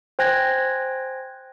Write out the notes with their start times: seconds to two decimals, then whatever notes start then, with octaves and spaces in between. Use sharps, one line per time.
0.19 C5 G5 G#5 F#6 G#6 A#6